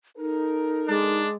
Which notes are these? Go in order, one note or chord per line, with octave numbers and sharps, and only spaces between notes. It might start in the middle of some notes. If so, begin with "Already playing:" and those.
D#4 A4 A#4
G#3 D4